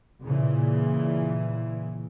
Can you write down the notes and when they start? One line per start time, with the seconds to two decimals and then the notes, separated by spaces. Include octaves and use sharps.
0.23 A#2 C#3 E3